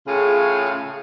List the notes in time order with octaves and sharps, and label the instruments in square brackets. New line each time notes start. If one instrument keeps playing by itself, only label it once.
[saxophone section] A2 C#3 F4 G#4